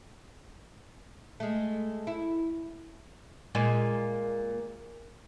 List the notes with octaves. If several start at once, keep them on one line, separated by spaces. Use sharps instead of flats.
G#3 A3
E4
A#2 G#3